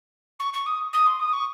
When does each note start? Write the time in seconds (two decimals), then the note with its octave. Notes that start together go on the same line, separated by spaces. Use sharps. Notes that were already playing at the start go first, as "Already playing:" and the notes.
0.39 C#6
0.53 C#6
0.66 D#6
0.93 D#6
1.06 C6
1.19 D#6
1.33 C#6